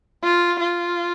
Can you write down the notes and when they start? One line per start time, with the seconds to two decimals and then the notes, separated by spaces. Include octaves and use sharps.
0.24 F4
0.61 F4